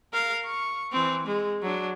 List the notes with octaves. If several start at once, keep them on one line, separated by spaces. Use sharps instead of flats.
A#4 F5
C#6
E3 C4
G#3
F#3 D4